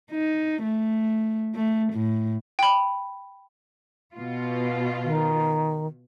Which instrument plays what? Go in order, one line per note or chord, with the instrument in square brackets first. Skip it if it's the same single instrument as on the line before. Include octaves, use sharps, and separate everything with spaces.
[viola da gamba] D#4
A3
A3
A2
[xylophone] G5 B5
[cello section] B2 F4
[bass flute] D#3